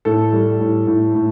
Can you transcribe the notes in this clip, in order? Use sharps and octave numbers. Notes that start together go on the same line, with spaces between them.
A2 A4
G3
A2
A2
A2